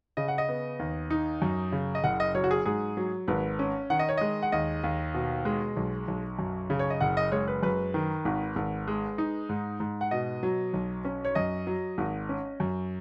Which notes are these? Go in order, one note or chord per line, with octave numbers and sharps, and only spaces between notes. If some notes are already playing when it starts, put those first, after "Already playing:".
C#3 D#5
F#5
D#5
B3
D#2
D#4
F#2
C#3
D#5
F#1 F#5
D#5
F#3 C#5
F#4
G#4
G#2 G#4
F#3
G#1 B4
C#4
D#3 F#5
D#5
C#5
G#3 D#5
F#5
D#2 D#5
D#2
B2
G#3
B1
B1
F#2
C#3
C#5
D#5
F#1 F#5
D#5
G#3 C#5
B4
F#2 B4
D#3
G#1
G#1
G#3
D#4
G#2
G#2
F#5
B2 D#5
F#3
B1
C#4
C#5
F#2 D#5
F#3
G#1
C#4
F#2